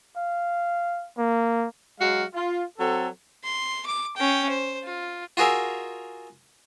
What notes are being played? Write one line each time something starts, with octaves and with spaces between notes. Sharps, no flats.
F5
A#3
F#3 G#3 F#4 F5
F4
F#3 C4 A4
C6
D6
C#4 G5
C5
F4
F4 F#4 G#4 A#4 E5